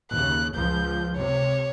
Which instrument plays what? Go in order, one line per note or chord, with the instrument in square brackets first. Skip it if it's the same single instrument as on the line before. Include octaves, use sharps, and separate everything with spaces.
[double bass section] D#2 C#3 [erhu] F#6
[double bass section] C#2 F3 [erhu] G6
[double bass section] C3 [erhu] C#5